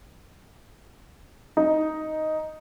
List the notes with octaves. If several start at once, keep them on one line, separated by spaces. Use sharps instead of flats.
D#4